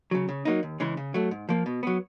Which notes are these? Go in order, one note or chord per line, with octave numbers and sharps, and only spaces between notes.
C#3 F#3
C#3
F#3 A#3 D#4
D#2
C#3 E3 G#3
C#3
F#3 A3
G#2
F3 A#3
B2
F#3 B3